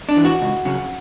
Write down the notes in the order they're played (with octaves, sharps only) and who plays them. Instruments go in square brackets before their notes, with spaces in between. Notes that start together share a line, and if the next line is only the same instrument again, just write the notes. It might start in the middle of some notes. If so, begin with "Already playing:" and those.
[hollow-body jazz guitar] D4
E3
F#4
C#2
C#3 F#3